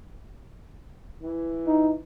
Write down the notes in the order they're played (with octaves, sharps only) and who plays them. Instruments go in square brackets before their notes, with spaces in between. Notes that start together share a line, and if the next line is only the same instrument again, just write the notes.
[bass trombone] E3
[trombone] D#4